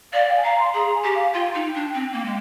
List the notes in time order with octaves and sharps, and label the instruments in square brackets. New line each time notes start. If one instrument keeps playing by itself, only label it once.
[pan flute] D5 [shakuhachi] F5
[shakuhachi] G5
G#5
[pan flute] F5 [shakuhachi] A#5
[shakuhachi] C6
[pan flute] G#4 [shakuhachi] A#5
[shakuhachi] G#5
[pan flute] G4
[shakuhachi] F5
[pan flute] F4 [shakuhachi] G5
[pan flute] D#4
D4
C4
A#3
G#3